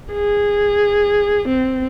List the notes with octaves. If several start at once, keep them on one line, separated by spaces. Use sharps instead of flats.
G#4
C4